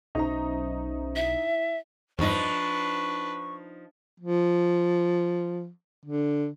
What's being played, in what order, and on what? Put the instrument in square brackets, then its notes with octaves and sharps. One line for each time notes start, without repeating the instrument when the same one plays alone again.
[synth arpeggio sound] B1 [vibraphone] C#4 C5 E5 [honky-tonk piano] D#4 A#5
[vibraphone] E4 [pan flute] E5
[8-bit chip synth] E2 G2 [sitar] F3 D#4 [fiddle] D4 B4 [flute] C#6
[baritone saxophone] F3
D3